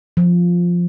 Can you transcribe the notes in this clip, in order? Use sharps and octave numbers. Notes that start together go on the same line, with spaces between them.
F3